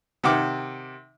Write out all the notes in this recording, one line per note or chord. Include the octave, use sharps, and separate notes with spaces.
C3 D#3 F#5 G5 D6 F6